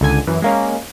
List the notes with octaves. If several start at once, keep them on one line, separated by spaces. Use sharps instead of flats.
C#2 D3 G#5
F#2 E3
G#3 A#3 C#4